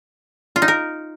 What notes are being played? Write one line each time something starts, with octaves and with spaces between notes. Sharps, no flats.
F4
D#4
A#4